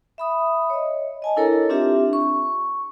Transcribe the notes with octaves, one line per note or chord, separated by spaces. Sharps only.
E5 B5 D#6
C#5 D#5
D#5 G#5 A5
D4 E4 A4 A#4 C#5 A#5
C4 D4 F4 G4 E5
C#6